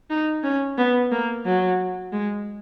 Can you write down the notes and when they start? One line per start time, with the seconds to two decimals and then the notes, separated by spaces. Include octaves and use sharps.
0.10 D#4
0.43 C#4
0.78 B3
1.12 A#3
1.46 F#3
2.12 G#3